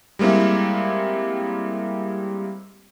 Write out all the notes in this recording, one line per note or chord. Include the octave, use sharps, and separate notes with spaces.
G3 G#3 A#3 C4 E4